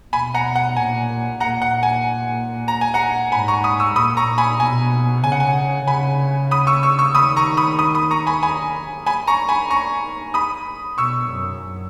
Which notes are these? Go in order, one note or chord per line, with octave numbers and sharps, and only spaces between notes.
B2 G#5 B5
F#5 A#5
F#5
A#2 G#5
A#2 F#5 A#5
F#5
G#5
A#5
G#5
F#5 A#5
G#2 G#5 B5
A#5 C#6
B5 D#6
C#6 E6
A#2 B5 D#6
A#5 C#6
G#5 B5
B2 G#5
C#3 G#5
F#5
G#5
C#3 G#5 B5
B5 D#6
C#6 E6
C#6 E6
C#6 E6
D#3 B5 D#6
A#5 C#6
B5 D#6
B5 D#6
B5 D#6
A#5 C#6
G#5 B5
G#5 B5
G#5 B5
A#5 C#6
G#5 B5
A#5 C#6
B5 D#6
B2 C#6 E6
F#2